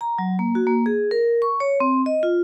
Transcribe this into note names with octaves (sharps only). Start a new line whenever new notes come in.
A#5
F#3
A#3
F#4
A#3
G#4
A#4
C#6
C#5
C4
D#5
F4